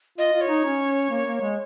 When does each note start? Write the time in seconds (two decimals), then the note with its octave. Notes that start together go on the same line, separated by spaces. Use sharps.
0.18 F4 D#5
0.33 F4
0.41 C#5
0.48 D#4
0.65 C#4
1.10 A#3
1.26 A#3
1.41 G#3